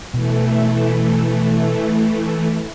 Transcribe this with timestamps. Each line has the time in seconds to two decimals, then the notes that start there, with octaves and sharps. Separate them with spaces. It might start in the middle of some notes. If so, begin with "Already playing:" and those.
0.14 B2 E3 A3